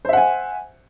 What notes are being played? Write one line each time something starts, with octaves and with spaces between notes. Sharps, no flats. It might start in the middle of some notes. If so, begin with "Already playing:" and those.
C5 E5 F#5 G#5